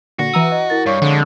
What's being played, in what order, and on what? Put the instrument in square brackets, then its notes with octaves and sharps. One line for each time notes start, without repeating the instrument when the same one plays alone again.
[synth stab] A#2 D3 [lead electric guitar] F#4 [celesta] A#6
[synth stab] E3 A#5 D#6 [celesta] E6
[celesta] D#5
E4 A#4 A6
[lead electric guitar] G2 [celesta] C#5 F5 C#6
[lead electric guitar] F2 G#3 [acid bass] D3